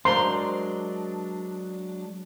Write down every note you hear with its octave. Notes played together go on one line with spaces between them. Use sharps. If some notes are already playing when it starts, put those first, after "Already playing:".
F#3 G#3 D4 A#4 C5 A#5 C6